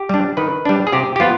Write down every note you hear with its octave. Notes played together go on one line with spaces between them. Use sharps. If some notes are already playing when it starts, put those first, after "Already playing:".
Already playing: G4
G3 D4
D#3 B4
G3 D4
G#4
C3 G4
G4
F3 B3 F4